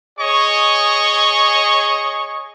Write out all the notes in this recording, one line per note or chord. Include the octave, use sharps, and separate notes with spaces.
G#4 C#5 D#5 C#6